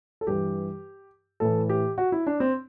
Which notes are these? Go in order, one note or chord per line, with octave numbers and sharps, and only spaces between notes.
A4
G2 E3 G4
A2 E3 A4
G4
F#4
E4
D4
C4